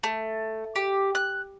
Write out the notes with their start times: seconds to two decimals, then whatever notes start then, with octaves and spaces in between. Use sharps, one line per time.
0.03 A3
0.76 G4
1.15 F#6